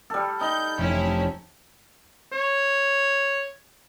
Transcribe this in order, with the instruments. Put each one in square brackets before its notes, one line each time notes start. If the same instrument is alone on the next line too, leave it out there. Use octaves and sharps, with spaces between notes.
[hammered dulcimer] G3 A4
[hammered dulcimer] D#4 [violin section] G6
[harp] F1 [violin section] C#4 E4
[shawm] C#5